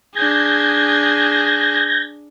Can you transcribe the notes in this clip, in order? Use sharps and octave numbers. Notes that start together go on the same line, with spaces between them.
D4 G#4 G6 G#6 A#6